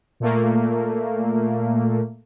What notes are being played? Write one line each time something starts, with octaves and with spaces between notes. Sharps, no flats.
A#2 A3 A#3